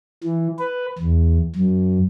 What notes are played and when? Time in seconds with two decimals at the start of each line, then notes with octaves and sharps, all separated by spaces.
0.24 E3
0.59 B4
0.99 E2
1.56 F#2